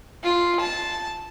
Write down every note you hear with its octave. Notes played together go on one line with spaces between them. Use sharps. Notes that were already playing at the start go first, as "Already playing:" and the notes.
F4
A5